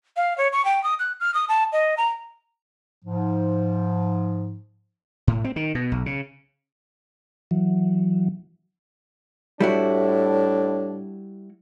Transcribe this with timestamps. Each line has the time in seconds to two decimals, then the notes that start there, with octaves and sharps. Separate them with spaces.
0.17 F5
0.38 C#5
0.53 C#6
0.65 G5
0.84 D#6
0.99 F#6
1.20 F6
1.34 D#6
1.49 A5
1.73 D#5
1.97 A#5
3.05 G#2 F3
5.27 A2
5.44 C4
5.56 D#3
5.75 B2
5.92 B1
6.06 C#3
7.51 E3 F#3
9.60 A2 G3 D4 E4 F#4